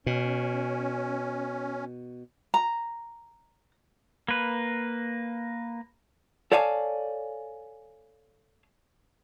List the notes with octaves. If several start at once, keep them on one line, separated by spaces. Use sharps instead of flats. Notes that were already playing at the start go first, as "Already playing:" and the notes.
B2 C#4
A#5
A#3 B4
A4 C#5 D5 F5 G#5 A5